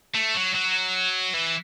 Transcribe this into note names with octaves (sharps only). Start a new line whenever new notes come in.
A3
F#3
F#3
E3